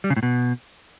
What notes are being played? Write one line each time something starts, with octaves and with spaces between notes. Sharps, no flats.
G3
C#3
A2
B2